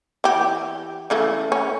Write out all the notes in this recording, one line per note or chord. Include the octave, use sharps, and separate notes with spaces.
E3 G4
C#3 E3 A3
C#4